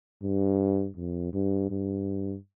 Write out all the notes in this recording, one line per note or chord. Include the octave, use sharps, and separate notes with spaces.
G2
F2
G2
G2